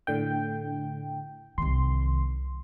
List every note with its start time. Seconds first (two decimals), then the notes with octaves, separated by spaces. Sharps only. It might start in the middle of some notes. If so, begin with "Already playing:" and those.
0.07 A2 D3 G5
1.58 C2 D#3 C6